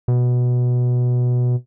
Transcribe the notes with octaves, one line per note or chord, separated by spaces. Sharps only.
B2